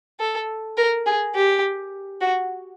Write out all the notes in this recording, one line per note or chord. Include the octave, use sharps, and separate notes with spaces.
A4
A#4
G#4
G4
F#4